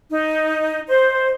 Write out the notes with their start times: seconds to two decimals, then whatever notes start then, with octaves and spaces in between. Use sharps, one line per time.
0.09 D#4
0.88 C5